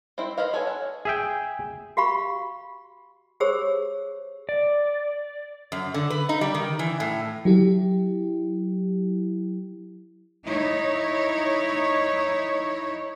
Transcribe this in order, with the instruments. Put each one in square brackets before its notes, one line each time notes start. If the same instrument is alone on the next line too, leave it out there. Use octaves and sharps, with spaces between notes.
[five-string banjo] C4 E4 C5
B4 C5 D#5 F5
G#4 A4 C#5 G#5
F#5
[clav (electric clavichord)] G#4 E5 G5
[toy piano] F#4 G4 F5 B5 C#6
G4 G#4 C5 C#5 E6
[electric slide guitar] D5
[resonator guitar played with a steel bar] F#2
D3
B4
D#4
G3
D#3
E3
A2
[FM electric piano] F#3 E4 G4
[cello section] D#4 E4 C#5